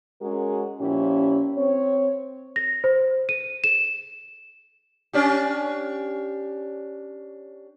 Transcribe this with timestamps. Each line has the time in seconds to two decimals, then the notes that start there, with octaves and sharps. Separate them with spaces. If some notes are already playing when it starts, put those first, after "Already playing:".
0.21 G#3 C#4 F#4 G#4 A#4
0.79 A#2 F3 C#4 E4 G4
1.57 C4 C#5
2.56 A#6
2.84 C5
3.29 D#7
3.64 E7
5.13 C#4 D4 G4